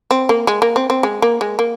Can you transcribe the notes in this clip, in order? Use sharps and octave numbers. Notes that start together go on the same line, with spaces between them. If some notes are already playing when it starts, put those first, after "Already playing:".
C4
A#3
G#3
A#3
C4
C4
G#3
A#3
G#3
A#3